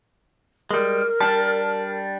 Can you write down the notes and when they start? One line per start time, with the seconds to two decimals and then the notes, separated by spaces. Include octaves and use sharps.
0.71 G3 G#3 A#4
1.21 G3 D4 A5